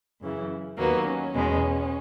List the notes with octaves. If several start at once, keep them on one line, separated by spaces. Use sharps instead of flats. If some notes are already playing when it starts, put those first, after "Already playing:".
F#2 C#3 E3
D#2 D#3 F#3 A#3 B3
C#4
E2 B2 G#3